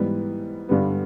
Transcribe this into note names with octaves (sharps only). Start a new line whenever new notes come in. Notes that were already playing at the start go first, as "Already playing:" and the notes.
Already playing: G#2 E3 G3 B3
G2 D3 G3 B3